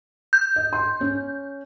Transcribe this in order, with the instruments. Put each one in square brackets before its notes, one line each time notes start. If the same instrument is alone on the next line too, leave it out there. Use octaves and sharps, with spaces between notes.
[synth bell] G6
[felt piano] D#5
C6
C#4